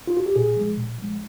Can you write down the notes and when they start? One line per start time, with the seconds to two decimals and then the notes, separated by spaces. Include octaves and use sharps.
0.07 F4
0.17 F#4
0.26 G4
0.36 A#2 G#4
0.56 F3 G#3
0.78 A#2
0.99 F3 G#3